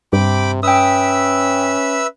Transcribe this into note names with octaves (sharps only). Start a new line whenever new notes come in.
G2 C3 G5 B5 D6
C#4 B4 E5 G5 D#6 E6